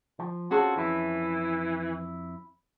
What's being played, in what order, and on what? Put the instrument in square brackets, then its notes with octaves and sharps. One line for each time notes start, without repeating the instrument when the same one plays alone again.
[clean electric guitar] F3
[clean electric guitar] C4 F4 A4 [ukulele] C#4 G#4 A5 [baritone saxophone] F#4
[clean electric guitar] F2 E4 [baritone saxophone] E3